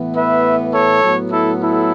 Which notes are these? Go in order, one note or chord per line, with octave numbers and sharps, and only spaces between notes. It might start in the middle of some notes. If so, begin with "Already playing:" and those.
Already playing: A2 E3 B3
B4 E5
A4 C#5
A2 F#3 B3
E4 A4
E4 A4